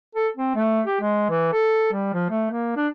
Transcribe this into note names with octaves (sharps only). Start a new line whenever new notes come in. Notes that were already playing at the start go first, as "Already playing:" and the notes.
A4
C4
A3
G4
G#3
E3
A4
G3
F3
A3
A#3
D4